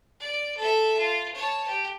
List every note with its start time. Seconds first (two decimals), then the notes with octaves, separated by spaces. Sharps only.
0.20 D5
0.57 A4 E5
0.98 F4
1.35 C#5 A5
1.67 G4